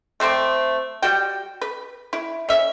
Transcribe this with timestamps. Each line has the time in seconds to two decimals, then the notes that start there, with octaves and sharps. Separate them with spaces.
0.20 A3 C4 C5 D5
1.02 G3 F#4 G5
1.61 B4
2.13 E4
2.49 C#4 E5